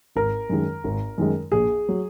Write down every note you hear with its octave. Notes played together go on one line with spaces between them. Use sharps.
G#1 A#4
F#2 D#3 G#3
G#1
F#2 D#3 G#3
A#1 G#4
F#3